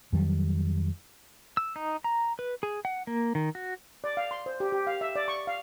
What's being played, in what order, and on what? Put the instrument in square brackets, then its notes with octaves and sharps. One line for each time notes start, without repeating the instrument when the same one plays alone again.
[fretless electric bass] F2 D#3 F#3 G3
[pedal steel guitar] E6
D#4
A#5
B4
G#4
F#5
A#3
D#3
F#4
[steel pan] D5
F5
C6
C5
G4
G4
F5
E5
D5
C#6
F5